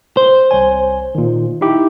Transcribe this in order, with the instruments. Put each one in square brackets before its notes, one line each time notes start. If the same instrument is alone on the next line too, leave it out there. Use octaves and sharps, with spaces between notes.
[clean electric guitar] C5
[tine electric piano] C2 C#5 G#5
A#2 D#3
D#4 E4 G4